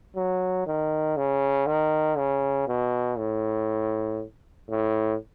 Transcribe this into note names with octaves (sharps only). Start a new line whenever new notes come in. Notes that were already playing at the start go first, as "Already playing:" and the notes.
F#3
D#3
C#3
D#3
C#3
B2
A2
A2